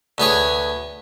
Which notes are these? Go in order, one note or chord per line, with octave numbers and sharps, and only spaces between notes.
D2 B3 G#4 C#5